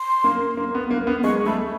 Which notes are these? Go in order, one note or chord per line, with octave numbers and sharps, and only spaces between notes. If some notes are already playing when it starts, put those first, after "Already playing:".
Already playing: C6
A#3
A#3
B3
A#3
B3
G#3 C#6
A3 B5